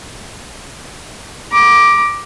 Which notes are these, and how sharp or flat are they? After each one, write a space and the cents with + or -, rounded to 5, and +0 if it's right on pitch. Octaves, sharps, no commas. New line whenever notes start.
A#5 +40 D6 +5